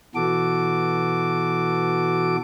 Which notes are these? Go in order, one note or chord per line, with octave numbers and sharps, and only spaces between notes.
B2 E3 F#4 A4 D6